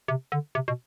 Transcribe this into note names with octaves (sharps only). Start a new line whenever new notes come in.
C3
D3
C3
B2